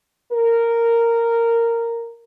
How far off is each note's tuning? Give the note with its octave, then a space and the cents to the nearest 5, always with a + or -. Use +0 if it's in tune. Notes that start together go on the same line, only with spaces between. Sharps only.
A#4 -10